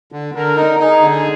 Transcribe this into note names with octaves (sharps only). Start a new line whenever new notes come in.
D3
D3 A#4
D#4
D#4 G#4
D3